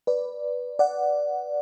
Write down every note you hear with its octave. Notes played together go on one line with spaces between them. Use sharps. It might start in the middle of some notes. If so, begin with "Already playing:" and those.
B4 D5
D5 F#5